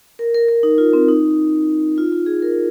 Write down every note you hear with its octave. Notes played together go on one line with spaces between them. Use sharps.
A#4
A#4
A#4
D#4
F4
C4
D#4
F4
F4
G#4
A#4